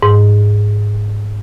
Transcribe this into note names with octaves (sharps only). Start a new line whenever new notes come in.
G#2